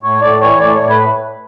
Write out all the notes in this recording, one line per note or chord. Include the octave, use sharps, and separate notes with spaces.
A2 C#5
A2 D5
E3 C#5
A2 D5
C#5
A2
B4